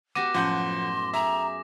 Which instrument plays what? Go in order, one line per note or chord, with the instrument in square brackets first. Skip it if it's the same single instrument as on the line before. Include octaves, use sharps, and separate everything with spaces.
[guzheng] B3 F#4 G4 [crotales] D6 A#6 [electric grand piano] D#7
[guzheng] F#2 A2 A5 [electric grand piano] F3 F#5 G6 [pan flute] C6
[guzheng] G#4 [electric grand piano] E5 [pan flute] A#5